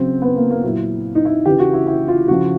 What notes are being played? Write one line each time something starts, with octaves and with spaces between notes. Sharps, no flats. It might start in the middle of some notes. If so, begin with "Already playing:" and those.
Already playing: C#3 F#3 C4
B3
A#3
A#3
A#2 F#3 E4
D#4
E4
C#3 E3 G4
F#4
E4
E4
F4
C#3 F3 F#4